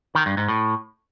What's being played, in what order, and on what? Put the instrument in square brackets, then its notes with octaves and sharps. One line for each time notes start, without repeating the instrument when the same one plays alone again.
[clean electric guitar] D#3
G2
G#2
A2